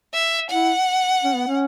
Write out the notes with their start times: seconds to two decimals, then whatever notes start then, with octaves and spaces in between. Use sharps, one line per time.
0.14 E5
0.50 E4 F#5
1.24 C#4
1.35 B3
1.47 C#4